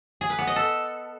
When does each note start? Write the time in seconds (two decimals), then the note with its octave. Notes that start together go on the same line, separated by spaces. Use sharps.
0.21 G#4
0.30 B4
0.39 B3
0.47 D#5
0.56 A4